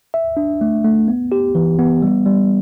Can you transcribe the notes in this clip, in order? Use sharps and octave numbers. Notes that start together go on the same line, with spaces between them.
E5
D4
A3
A3
B3
G4
E3
B3
G3
G3